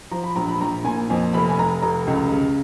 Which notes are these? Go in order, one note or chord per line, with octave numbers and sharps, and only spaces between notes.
F3 A#5
B5
A#1 A#5
B5
A#1 A#5
A#2 G#5
F2 G#5
F1 B5
G#5
F1 A#5
F1 A#5
C#2
C#3